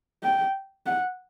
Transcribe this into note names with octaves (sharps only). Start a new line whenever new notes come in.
G5
F#5